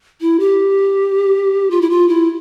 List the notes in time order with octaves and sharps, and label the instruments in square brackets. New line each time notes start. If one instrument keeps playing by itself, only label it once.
[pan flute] E4
G4
F4
E4
F4
E4